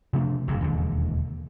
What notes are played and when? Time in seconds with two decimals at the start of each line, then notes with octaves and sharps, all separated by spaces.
0.13 C3 F3 A3 D4
0.48 F#1 F2 G#2 C3
0.61 E1 D#2 D3